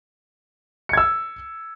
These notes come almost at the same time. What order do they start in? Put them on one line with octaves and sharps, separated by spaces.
C#7 G#6 E6